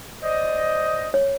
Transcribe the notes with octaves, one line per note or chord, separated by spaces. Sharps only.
C5 D5 D#5
C#5